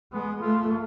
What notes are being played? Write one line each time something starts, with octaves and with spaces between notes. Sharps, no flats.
G#3 B3
A3 F4